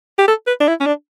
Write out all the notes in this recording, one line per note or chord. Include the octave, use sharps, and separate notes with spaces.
G4
A4
B4
D4
E4
C#4
D4